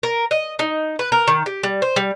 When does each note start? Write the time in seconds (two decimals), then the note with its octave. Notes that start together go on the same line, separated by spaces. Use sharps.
0.03 A#4
0.31 D#5
0.59 D#4
0.99 B4
1.12 A#4
1.28 D#3
1.46 G4
1.63 G3
1.82 C5
1.96 G3